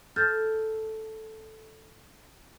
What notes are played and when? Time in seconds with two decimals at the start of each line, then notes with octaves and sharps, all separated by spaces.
0.16 A4 F6 G6 A6